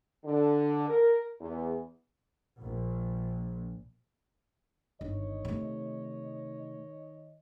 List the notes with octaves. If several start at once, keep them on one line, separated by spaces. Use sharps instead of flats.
D3
A#4
E2
A#1
G1 D#3 C#5 D#5
C3 A3